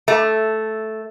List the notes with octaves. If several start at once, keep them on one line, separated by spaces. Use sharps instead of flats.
A3